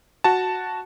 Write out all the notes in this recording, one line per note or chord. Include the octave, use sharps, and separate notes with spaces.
F#4 A5